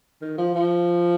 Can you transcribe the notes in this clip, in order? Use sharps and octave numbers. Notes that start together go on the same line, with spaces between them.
D#3
F3
F3